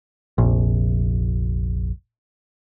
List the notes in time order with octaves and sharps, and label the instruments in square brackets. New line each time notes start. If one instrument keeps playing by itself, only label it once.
[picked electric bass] F1 A#1